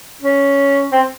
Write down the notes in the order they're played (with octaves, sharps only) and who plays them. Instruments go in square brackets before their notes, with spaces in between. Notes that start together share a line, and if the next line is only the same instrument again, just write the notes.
[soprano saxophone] C#4
C4